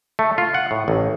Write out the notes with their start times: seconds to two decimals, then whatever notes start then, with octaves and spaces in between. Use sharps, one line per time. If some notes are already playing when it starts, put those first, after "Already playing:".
0.19 A3
0.38 F4
0.54 F#5
0.71 A2
0.88 A1